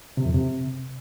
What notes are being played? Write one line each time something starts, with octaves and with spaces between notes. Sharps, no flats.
C3
F2
C3